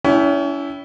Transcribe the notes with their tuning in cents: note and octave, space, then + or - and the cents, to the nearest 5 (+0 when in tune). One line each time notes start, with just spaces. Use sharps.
C#4 +35 E4 +0 G5 +0